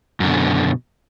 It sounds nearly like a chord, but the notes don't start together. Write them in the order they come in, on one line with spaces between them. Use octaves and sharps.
F#2 D3 B2